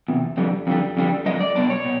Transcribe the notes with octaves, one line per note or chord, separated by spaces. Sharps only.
E2 C3
F2 D3 G3
F2 D3 G3
F2 D3 G3
F2 D3 G3 D#5
D5
B2 G3 B3 D4 D5
C#5
B2